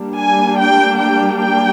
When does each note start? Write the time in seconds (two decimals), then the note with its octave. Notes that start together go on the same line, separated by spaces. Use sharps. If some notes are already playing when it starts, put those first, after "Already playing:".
Already playing: G3 A#3 D4
0.17 G#5
0.58 G5
0.99 G5
1.40 G5